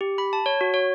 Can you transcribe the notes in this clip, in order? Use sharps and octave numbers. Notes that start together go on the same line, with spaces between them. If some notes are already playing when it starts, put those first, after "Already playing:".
G4
B5
A5
C#5
F#4
C#5